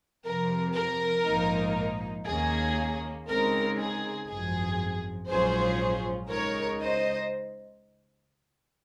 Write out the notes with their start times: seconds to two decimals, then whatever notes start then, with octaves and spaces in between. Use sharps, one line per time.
0.24 F2 C3 F3 A#4
0.75 A#4
1.25 A#1 G#2 F3 A#3 D#4
2.26 D#2 D#3 A#3 C#4 G#4
3.27 C#2 C#3 G#3 C4 D#4 A#4
3.77 G#4
4.28 G#1 F#2 F3 G#4
5.28 A#1 G#2 F#3 C#4 F4 G#4 C5
6.29 C#2 C#3 G#3 D#4 A#4 C#5
6.80 C5 D#5